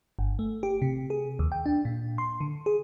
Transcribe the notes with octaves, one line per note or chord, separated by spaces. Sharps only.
G1
A3
G4
C3
G#4
D#2
G5
D4
A#2
C6
D3
G#4